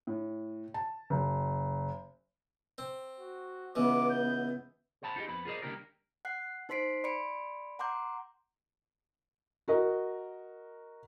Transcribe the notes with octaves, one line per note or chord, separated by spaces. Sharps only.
A2
A5
F#1
C4
F#4
C#2 E3 B3 D6
G6
C5 F#5 A5 B5
D#4 F4 G4 G#4 D#5
F2 B3 C5 B5
F4 G#4 A#4 C5 D5 D#5
C#2 D3 G3 A#3 G4 A#4
F#5 F#6 C7
D#4 C5 C6 B6 C7 D7
D5 B5 C6 C#7 D7
F#5 A#5 C6 D6 G6
F#4 A#4 D#5